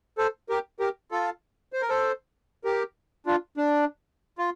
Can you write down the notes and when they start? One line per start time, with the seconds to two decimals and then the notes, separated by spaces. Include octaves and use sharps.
0.18 A4 C5
0.49 G4 A#4
0.79 G4 A#4
1.11 F4 A4
1.73 C5
1.82 A#4
1.89 A4 C5
2.64 G4 A#4
3.26 D4 F4
3.57 D4
4.38 F4